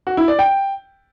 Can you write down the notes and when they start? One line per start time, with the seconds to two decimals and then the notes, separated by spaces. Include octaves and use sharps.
0.07 F#4
0.17 E4
0.28 D5
0.39 G5